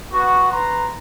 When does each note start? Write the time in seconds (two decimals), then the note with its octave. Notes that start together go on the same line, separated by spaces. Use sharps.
0.13 B3 F#4
0.51 B4 A#5 C6